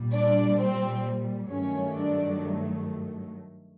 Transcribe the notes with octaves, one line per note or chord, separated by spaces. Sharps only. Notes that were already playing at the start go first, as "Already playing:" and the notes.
Already playing: A#2 G3
D4 D5
C4 C5
G2 D#3 F#3 A3 C#4 C#5
D4 D5